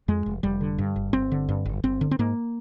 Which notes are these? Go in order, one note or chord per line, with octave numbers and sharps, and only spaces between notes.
F2 G#3
F1
F1 G3
D3
G2
G1
G1 C4
D3
G2
G1
G1 C4
D3
C4
G#2 A#3